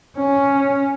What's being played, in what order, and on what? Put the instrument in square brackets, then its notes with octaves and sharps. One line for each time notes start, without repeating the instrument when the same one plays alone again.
[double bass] C#4